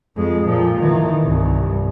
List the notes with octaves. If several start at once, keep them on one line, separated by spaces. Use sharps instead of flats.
F2 G#3
A#2 F3
D#3 E3
C2 G2